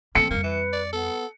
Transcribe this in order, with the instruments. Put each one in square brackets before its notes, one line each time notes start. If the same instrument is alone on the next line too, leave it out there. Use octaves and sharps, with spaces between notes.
[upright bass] E3 A#3 [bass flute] C4 [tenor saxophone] A4 [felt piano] C#7
[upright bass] F2 G3 [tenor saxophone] A#3
[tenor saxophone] E3 [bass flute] B4
[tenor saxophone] D5
[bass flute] B3 [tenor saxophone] A4